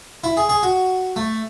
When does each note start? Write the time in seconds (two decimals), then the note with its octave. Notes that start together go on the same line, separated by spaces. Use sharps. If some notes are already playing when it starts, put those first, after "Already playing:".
0.24 E4
0.37 G#4
0.49 G#4
0.63 F#4
1.16 A3